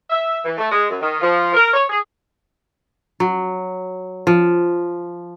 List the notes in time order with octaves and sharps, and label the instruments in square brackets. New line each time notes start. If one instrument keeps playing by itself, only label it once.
[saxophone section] E5
E3
A3
G#3
F#2
D#3
F3
A#4
C#5
G#4
[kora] F#3
F3